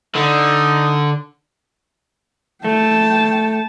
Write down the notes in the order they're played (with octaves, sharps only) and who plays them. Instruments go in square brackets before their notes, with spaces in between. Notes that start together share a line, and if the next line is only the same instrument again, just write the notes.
[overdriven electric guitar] D3 [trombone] D#4
[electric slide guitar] A3 [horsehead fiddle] G5 A5